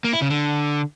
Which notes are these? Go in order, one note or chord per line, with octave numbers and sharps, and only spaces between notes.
A#3
E4
C#3
D3